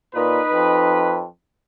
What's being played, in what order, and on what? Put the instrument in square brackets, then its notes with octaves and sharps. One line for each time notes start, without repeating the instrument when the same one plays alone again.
[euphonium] A#2 [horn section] D#4 B4
[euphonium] F2